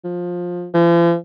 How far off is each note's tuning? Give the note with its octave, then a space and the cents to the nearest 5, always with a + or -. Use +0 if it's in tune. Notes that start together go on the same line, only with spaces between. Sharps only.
F3 +20
F3 -45